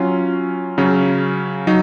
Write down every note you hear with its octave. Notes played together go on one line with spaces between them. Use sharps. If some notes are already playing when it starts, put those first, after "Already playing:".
Already playing: F#3 C#4 F4
C#3 F#3 C#4
F#3 D#4